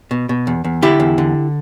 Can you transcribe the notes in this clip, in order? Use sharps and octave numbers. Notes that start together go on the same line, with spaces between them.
B2
B2
E2
E2
D3 E4 G4
E2
D3